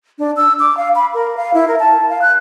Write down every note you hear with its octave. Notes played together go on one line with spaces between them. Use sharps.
D4
E6
D6
F5
B5
A#4
F5
E4
A#4
A5
F5
F#6